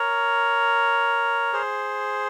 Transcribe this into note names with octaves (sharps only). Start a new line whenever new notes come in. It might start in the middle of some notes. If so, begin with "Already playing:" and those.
Already playing: A#4 C#5
G#4 C5